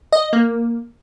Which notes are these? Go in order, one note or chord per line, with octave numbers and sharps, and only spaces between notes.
D#5
A#3